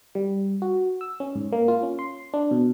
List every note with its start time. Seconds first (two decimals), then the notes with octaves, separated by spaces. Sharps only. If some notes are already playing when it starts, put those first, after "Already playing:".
0.15 G3
0.62 F#4
1.01 E6
1.20 C#4
1.35 G#2
1.52 A#3
1.68 F4
1.83 C#4
1.99 C6
2.34 D4
2.51 B2